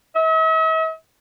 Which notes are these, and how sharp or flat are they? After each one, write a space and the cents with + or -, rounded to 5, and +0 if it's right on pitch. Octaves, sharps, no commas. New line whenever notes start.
E5 -45